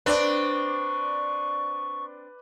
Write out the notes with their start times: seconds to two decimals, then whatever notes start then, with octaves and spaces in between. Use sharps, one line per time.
0.06 C4 D4 B4 D5 C#6